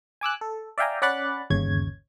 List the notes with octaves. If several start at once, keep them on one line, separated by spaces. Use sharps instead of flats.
G#5 D6 E6 F#6
A4
D5 E5 F5 G5 G#5 A#5
C#4 D5 F#5 B5 F#6 A6
G1 D#2 C#3 C#5 G#6